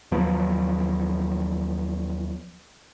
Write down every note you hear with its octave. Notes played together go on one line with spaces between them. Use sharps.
D#2 F3 F#3 B3